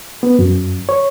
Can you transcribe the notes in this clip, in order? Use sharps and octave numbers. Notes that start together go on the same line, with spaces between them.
B3
F#2
C#5